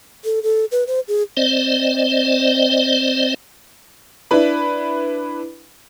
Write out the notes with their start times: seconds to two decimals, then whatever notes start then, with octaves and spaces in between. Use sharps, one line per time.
0.24 A4
0.43 A4
0.72 B4
0.87 C5
1.08 G#4
1.37 C4 C5 D5 D#5
4.31 D4 E4 B4 B5